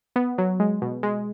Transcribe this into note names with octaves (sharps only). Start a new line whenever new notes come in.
B3
F#3
G#3
B2
G#3